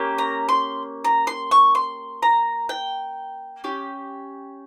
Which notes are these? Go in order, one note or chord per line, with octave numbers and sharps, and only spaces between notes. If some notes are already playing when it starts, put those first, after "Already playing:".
Already playing: A#3 C#4 G4
A#5
C6
A#5
C6
C#6
C6
A#5
G5
C#4 G4